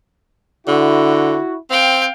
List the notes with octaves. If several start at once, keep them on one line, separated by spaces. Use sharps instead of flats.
D3 E4 F#4
C4 F5 G5